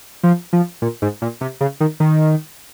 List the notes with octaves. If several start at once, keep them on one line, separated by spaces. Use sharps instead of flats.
F3
F3
A#2
G#2
A#2
C3
C#3
D#3
D#3